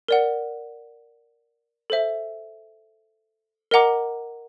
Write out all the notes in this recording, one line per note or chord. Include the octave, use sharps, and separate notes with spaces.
A#4 D5 F#5
A4 C5 E5
A#4 D#5 F#5 A#5 D6